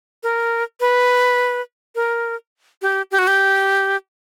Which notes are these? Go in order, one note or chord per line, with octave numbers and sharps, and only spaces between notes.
A#4
B4
A#4
G4
G4
F#4
G4